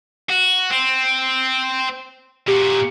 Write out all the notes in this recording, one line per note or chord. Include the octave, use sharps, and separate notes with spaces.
F#4
C4
A#2 F#4 G4